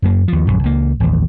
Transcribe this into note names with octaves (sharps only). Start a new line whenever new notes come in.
F#2 A#3
D#2 F3
A#1 F#2
C#2 A#3
A1 D#2